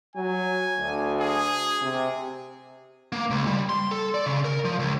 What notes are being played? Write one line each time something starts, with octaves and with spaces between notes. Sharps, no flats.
F#3 G#5
D2
G#4
C3
A#3
C#2
G3
C6
A4
D5
C#3
A#4
F3
C#2